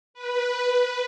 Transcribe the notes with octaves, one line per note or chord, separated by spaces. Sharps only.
B4